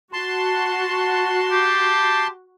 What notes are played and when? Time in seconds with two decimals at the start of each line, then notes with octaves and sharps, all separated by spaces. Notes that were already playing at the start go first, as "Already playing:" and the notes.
0.13 F#4 A5 C6
1.51 G4